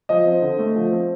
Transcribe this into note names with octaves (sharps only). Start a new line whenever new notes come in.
F3 D#5
C4
D3
A3
F3
C4